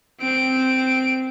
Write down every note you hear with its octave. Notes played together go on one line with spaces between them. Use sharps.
C4 D7